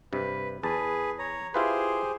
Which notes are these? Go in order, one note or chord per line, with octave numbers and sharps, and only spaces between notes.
G2 C3 B4
E2 G#4 B4 A5
C#5 A#5
E4 F4 G4 G#4 B4 C5